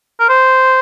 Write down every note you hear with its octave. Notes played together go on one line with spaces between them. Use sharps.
A#4
C5